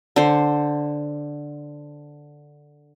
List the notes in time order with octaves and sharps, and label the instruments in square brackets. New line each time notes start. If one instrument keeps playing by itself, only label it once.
[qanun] D3 C5